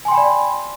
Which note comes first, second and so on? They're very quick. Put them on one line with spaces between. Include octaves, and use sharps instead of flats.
G#5 C6 G5 B5 D5